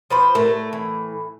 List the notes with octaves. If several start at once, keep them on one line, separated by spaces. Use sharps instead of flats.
F3 B4 C5
A2 A3 A#4
E3